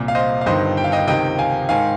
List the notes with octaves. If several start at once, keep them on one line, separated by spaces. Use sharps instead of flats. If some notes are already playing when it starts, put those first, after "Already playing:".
Already playing: C2 A#2
F5
C5 D#5
F5
G1 G2 D#3 C5 D#5
G5
F5
D#5 G5
C#2 C3 D#3 D#5 G5
F5 G#5
G#2 D#3 F5 G#5